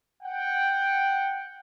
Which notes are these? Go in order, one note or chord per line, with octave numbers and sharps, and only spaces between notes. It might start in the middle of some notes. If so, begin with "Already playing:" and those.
F#5 G5